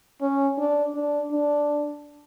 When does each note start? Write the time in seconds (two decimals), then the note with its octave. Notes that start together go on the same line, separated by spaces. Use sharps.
0.22 C#4
0.58 D4
0.95 D4
1.32 D4